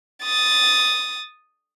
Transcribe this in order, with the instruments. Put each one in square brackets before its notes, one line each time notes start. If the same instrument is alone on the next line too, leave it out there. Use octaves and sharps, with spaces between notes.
[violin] D#6 A6